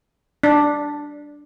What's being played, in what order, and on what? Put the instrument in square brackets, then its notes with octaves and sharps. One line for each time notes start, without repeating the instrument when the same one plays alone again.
[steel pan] D4